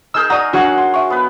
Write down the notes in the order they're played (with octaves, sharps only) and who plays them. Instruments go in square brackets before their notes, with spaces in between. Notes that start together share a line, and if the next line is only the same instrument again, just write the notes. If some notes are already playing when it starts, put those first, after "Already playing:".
[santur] D#4 G#4 A#4 [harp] E6 F6 G6
[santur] F#4 [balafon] D5 F#5 [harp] A#5 D#6
[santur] F#3 F5 A#5 [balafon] D4 [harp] F#4 G#4 F#5
[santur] C6
[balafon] E5 C#6
[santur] B3 B4